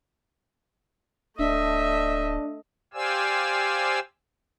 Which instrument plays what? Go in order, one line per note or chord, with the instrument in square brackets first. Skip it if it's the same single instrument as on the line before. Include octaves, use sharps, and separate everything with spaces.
[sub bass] D1 [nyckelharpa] A3 D#5 [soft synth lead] D4 [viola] E5
[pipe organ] G4 C5 D5 F5 G#5 E6